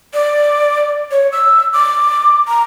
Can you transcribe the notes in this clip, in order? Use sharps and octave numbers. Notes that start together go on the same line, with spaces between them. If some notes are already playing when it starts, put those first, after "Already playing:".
D5
C#5
E6
D6
A#5